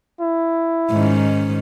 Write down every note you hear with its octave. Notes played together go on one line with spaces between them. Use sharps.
E4
G#2 D#3 C#4